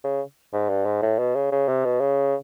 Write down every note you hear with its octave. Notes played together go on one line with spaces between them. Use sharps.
C#3
G#2
G2
G#2
A2
B2
C#3
C#3
C3
B2
C#3